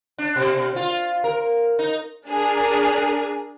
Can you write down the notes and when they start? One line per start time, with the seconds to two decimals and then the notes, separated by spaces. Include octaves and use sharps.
0.18 D4
0.36 B2
0.76 F4
1.24 A#4
1.79 D#4
2.28 D4 G#4 A#4